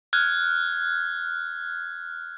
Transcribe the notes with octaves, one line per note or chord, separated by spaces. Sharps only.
F6 F#6 G#6